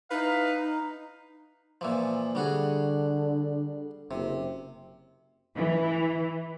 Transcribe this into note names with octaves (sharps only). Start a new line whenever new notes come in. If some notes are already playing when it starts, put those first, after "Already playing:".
D#4 E4 B4 F5
A#2 E3 F3
D3 G3 F#4 G#4
F#1 C3
E3